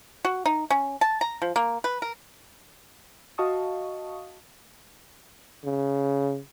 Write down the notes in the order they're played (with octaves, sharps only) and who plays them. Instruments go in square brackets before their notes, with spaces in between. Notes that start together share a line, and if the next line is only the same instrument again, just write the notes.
[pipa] F#4
D#4
C#4
A5
A#5
F3
A#3
B4
A#4
[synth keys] F#4 D#5 F5 A5 C#6 D#6
[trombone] C#3